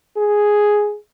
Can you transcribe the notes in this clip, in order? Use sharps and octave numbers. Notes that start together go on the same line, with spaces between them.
G#4